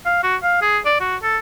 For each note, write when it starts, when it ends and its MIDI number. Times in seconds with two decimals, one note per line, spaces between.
0.06 0.23 77
0.23 0.36 66
0.43 0.61 77
0.62 0.79 68
0.86 0.96 74
1.00 1.16 66
1.22 1.38 69